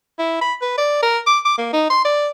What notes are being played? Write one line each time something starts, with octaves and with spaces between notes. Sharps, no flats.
E4
B5
B4
D5
A#4
D6
D6
A#3
D#4
C6
D5